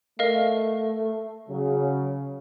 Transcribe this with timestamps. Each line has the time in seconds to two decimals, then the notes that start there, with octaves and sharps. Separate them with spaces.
0.19 A3 A#4 D#5 F5
1.49 C#3 F#3